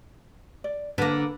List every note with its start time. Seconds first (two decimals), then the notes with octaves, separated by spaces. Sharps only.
0.64 D5
0.98 D3 A#3 B4